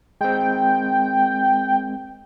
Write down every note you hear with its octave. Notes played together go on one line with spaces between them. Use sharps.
G#3 C4 G5